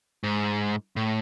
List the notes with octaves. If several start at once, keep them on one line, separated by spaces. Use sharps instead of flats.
G#2
A2